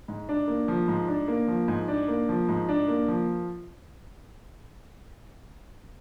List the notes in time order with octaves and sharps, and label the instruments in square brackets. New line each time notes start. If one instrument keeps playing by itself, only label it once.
[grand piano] G#2
D4
A#3
F3
G#2
D4
A#3
F3
G#2
D4
A#3
F3
G#2
D4
A#3
F3